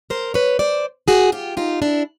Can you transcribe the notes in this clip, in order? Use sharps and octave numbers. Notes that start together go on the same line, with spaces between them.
A#4 C5
B4 C#5
C5 D5
F#4 G#4
F4 G4
D#4 F4
D4 E4